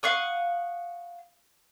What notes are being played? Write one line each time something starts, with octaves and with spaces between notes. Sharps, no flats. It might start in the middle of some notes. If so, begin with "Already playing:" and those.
F5 F#5 C#6 D#6